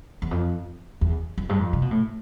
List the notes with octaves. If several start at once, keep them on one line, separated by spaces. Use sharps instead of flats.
E2
F2
E2
F2
G2
F2
C3
B2
A2